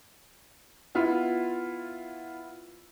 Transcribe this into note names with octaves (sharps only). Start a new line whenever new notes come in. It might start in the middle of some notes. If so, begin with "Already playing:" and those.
B3 E4 F4